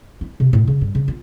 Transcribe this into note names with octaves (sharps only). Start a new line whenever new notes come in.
E4
C3
A2
C#3
G2
C#3
F4